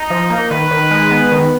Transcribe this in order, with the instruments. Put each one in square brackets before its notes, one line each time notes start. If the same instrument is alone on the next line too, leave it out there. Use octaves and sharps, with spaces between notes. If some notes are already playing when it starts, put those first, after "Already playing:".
Already playing: [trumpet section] D#4
[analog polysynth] F3
A#3
[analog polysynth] D#3 [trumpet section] B4
[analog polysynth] D#3
G#3
B3
D#3